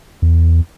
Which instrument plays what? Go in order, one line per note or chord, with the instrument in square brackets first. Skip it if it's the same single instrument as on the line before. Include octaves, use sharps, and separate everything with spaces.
[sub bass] E2